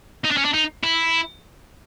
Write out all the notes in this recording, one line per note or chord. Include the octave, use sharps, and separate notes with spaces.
D#4
D4
C#4
D4
D#4
E4